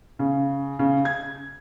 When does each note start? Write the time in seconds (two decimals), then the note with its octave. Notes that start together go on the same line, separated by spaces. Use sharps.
0.19 C#3
0.79 C#3
1.05 G#6